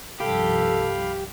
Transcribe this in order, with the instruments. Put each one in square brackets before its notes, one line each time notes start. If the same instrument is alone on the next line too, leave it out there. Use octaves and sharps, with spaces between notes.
[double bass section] C2 G2 F3 [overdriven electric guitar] G4 [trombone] A4 [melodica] F5 B5